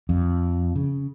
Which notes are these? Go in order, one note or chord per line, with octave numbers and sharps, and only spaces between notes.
F2
C#3